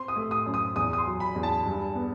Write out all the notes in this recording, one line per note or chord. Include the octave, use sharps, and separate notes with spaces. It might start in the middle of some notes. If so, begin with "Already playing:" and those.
Already playing: C4 C6
D#6
A3
D#6
F#2
D#6
E2 D#6
D#6
C6
F#3
B5
E2
A5
G2
B3